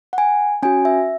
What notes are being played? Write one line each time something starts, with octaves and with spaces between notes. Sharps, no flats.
F#5
G#5
C#4 F#4 G#5
E5